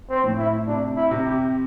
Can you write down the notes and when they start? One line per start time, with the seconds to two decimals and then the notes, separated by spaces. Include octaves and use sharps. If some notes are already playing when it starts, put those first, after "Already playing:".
0.10 C4
0.24 A2
0.38 E4
0.67 C3 D4
0.96 E4
1.11 C3
1.25 G4